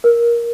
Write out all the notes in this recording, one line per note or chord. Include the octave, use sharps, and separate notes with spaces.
A#4